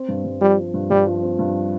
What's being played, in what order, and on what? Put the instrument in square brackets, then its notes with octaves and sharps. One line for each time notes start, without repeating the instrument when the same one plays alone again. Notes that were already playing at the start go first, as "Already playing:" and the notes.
Already playing: [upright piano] C4
G2
G2
[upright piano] F3 [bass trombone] G3
[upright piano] C4
G2
[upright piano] G2 [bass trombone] G3
[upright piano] F3
C4
G2